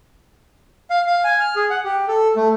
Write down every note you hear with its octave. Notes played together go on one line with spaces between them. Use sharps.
F5
F5
G#5
F6
G#4
F#5
G4
A4
A3